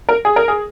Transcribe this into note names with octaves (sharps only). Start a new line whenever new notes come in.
A#4
G#4
A#4
G#4